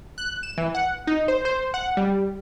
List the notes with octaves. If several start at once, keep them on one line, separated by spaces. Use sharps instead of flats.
F#6
E7
E3
F#5
D#4
C5
C5
F#5
G3